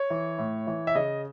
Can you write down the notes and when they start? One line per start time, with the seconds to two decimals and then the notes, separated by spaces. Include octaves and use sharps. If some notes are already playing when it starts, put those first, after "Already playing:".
Already playing: C#5
0.10 E3
0.38 A2
0.67 E3
0.87 E5
0.95 C#3 D#5